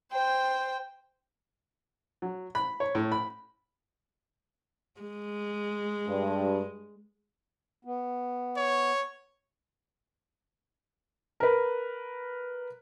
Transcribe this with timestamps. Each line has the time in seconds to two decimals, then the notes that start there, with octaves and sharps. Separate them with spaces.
0.12 C5 G5
2.22 F#3
2.55 B5
2.80 C#5
2.95 A2
3.12 B5
5.00 G#3
6.07 G2
7.85 B3
8.57 C#5
11.40 A#4 B4